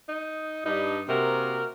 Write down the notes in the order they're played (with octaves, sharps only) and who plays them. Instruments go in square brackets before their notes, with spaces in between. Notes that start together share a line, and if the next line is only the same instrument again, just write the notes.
[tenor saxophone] D#4
[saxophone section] G2 [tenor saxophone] D#4
[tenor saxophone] C3 [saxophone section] A#3 F#4 A#4